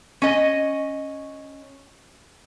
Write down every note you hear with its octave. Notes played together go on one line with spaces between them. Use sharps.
C#4 D#5